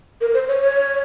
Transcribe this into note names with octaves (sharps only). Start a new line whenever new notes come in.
A#4
C5
C#5
C#5